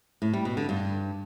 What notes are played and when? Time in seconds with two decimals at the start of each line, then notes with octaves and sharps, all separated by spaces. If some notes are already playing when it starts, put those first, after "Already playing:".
0.22 A2
0.33 G3
0.45 B2
0.57 D3
0.69 G2